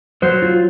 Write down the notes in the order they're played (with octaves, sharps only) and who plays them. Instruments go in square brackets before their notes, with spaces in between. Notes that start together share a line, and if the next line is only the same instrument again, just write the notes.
[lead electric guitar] F#3 [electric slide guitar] C5
[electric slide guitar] F4